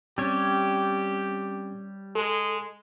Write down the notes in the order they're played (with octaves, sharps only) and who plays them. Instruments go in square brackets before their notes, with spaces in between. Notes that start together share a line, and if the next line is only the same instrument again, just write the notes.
[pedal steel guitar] G3 C#5 [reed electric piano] C4 C#4 [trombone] G4
[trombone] G#3 [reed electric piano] A4